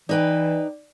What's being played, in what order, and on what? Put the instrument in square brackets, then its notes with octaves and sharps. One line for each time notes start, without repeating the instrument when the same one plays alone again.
[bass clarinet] E3 [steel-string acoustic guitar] D#4 B4 G5 [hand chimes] D5